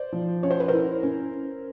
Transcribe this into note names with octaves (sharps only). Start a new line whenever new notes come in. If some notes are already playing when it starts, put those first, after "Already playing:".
Already playing: C5 D5
F3
C#4 C#5
C5
B4
A#4 C5
E4
C#4